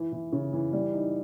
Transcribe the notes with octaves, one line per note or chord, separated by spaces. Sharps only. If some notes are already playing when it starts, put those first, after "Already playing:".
Already playing: E3
E3
C#3
E3
G3
D#4